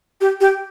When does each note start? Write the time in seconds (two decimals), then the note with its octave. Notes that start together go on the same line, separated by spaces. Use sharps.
0.21 G4
0.41 G4